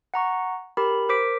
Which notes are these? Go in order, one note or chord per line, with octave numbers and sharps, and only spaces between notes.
F#5 A#5 C#6
G4 A#4 B5
A#4 C5 D6 B6 D7